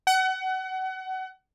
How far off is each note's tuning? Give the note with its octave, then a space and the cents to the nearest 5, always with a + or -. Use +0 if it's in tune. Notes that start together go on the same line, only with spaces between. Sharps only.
F#5 +30